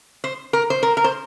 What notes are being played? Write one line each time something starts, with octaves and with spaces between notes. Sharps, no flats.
C5
A#4
C5
A#4
A#4
C5